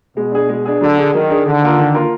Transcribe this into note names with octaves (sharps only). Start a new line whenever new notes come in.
B2 G#3
D4 G#4
G#3
D4 G#4
D3 F#3
D4 G#4
D#3 F#3
D4 G#4
D3 D#3
A#3 F4 A#4
D#3
A#3 F4 A#4